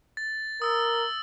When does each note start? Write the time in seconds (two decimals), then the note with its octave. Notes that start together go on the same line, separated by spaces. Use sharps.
0.17 A6
0.62 A#4 D#6 E6 A6